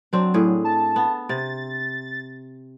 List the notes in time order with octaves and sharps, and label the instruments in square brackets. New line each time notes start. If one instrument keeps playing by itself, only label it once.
[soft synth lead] F#3 [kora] C4 D4
[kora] A2 G#4
[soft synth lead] A5
[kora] B3
[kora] C3 [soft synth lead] A6